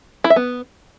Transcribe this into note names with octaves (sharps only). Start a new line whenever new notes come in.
E4
E5
B3